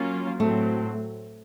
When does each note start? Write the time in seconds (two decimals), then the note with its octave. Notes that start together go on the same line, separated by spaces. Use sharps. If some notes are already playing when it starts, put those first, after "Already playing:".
Already playing: F#3 A#3 C#4 F4
0.39 A2 F#3 A3 C4